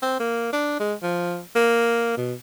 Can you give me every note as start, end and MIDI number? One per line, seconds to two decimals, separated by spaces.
0.02 0.19 60
0.20 0.51 58
0.53 0.79 62
0.80 0.94 56
1.02 1.39 53
1.56 2.13 58
2.17 2.33 47